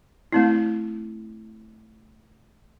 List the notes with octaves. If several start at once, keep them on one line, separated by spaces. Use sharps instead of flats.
A3 C4 E4